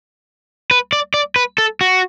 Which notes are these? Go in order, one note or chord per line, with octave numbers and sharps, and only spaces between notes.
B4
D5
D5
B4
A4
F#4